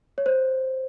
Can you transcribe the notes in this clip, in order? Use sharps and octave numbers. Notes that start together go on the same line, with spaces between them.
C#5
C5